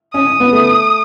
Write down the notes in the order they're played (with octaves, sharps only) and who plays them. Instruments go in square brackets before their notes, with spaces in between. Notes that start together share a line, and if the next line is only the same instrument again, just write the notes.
[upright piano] C#4 [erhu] D#6
[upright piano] C#4
B3
A3